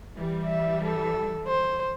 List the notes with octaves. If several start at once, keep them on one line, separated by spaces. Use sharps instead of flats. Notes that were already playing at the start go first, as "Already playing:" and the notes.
E3 G3
E5
A4
C5